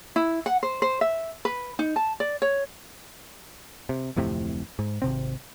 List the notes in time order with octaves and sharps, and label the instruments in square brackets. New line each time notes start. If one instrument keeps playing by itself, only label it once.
[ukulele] E4
F#5
C5
C5
E5
B4
D#4
A5
D5
C#5
[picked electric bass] C3
D1 F2 A2 C3
G#2
G#1 C3 C4